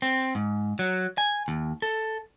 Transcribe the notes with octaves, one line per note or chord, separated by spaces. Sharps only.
C4
G#2
F#3
G#5
D#2
A4